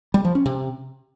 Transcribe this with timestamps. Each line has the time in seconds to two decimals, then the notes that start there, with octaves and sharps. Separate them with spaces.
0.14 G3
0.25 F3
0.35 C#4
0.46 C3